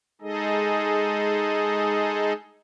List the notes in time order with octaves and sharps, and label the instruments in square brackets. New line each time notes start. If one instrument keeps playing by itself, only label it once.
[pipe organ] G#3 D#4 G#4 A4 D#5